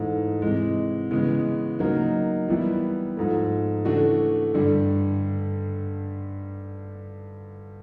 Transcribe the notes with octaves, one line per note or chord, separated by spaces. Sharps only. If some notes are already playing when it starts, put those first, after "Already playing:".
Already playing: G#2 E3 A3
C3 E3 G#3
C#3 E3 G#3 B3
C#3 F#3 A#3 D#4
E3 G3 B3 E4
G#2 F3 A3
C#3 E3 A3 D4 F#4
G2 D3 G3